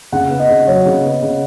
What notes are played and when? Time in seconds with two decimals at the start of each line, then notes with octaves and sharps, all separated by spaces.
0.12 C#3 F#5
0.30 B3
0.39 D#5
0.49 C#3
0.67 F#3 C#5
0.86 C#3
1.04 B3
1.22 C#3